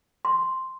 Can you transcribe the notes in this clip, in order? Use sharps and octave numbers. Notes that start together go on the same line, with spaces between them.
C6